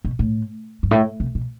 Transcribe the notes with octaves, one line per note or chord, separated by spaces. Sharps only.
B2
A2
G2
A2
C3
B2